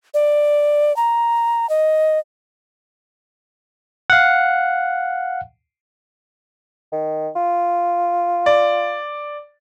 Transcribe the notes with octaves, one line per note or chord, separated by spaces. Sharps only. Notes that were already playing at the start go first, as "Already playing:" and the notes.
D5
A#5
D#5
F5 F#5
D#3
F4
D5